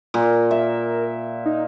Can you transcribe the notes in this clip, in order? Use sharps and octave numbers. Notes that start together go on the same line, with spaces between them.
A#2 A#4
E5
D#4